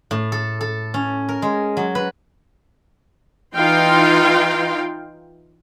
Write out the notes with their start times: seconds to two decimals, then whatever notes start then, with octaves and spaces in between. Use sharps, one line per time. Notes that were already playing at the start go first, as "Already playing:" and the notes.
0.11 A2
0.32 A4
0.61 A4
0.94 C#4
1.29 A#4
1.42 G#3
1.77 F#3
1.95 B4
3.55 E3 D#4 F4 F5 G5 C6